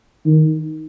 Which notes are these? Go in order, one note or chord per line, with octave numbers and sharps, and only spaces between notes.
D#3